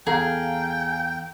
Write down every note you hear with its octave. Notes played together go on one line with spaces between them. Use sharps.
E2 G#4 A4 F5 G5 A#5